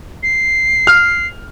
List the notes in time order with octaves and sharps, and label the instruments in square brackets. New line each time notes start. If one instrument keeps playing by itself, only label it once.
[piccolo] C7
[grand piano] F6